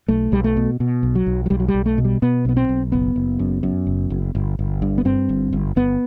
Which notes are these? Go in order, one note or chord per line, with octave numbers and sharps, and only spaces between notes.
B1 A3
B1 G3
A3
B2
B2
B1
F#3
B1
F#3
B1 G3
F#3
G3
B1
A3
B2
G3
B2 B3
B1 B3
C4
B1
F#1 B3
F#1
F#2
F#2
F#1
F#1
G1
G1
G2
B3
G2 C4
G1
G1
G1 B3